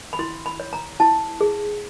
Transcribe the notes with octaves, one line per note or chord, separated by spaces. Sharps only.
B5
E4 C6
B5
C#5
A#5
E4 A5
G#4